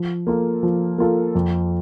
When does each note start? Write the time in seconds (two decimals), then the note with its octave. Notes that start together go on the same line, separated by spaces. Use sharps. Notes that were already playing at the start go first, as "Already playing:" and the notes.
Already playing: F3
0.27 A#3 F4 A4
0.63 F3
0.98 A#3 F4 A4
1.35 F2